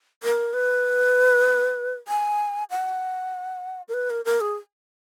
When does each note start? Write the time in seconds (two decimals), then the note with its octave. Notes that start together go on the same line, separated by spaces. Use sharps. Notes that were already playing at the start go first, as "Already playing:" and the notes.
0.23 A#4
0.53 B4
2.08 G#5
2.70 F#5
3.88 A#4
3.94 B4
4.10 A#4
4.25 A#4
4.41 G#4